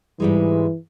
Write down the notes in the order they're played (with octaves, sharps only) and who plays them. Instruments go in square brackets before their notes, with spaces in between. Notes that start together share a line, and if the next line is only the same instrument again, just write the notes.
[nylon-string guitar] G#2 G3 G#3 [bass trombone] E3